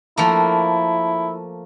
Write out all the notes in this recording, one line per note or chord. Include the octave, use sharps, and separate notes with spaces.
F3 A3 A#3 E4